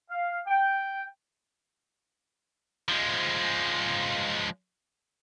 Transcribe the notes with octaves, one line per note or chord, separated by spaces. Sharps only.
F5
G5
F3 G#3